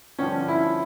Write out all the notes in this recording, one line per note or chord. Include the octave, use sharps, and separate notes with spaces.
G2 D3 F3 C#4
E4